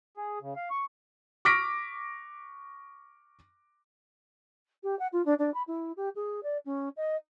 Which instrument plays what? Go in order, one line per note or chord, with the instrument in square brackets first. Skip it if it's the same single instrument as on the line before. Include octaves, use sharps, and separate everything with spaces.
[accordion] G#4
C#3
F5
C#6
[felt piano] C#6 D6 F6 A#6 B6 D7
[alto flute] G4
F#5
F4
D4
D4
B5
E4
G4
G#4
D5
C#4
D#5